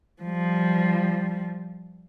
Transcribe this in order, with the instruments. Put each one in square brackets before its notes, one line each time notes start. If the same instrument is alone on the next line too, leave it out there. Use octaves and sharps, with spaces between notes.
[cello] F3 G3